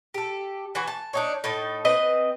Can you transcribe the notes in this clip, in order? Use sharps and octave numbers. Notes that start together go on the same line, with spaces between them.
G4 A4
E3 F#4 G#5
A5
D4 D#4 C#5
A2 D#4 A4
C4 B4 D#5